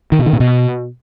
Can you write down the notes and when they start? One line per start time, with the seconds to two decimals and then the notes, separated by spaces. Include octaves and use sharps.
0.12 D#3
0.19 B2
0.26 D#3
0.33 A#2
0.40 B2